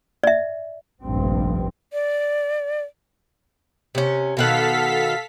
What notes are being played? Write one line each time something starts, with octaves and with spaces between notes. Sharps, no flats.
D5 E5
F1 A#1 G2 C4
D5
C3 C#4
B2 D#3 A4 F5 F#5 B6